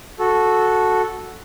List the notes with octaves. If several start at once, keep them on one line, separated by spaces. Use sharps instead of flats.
F#4 A4